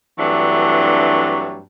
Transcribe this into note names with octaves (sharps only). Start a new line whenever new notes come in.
G2 E3 F#3 A3 C4 D4